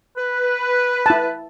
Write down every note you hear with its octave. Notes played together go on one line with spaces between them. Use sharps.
B4
E4 A5